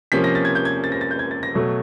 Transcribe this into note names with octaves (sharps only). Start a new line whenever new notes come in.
C3 F3 A#3 C#4 B6
A#6
A6
G#6
G6
G#6
A6
A#6
A6
G6
G#6
A6
A#6
B2 F#3 A3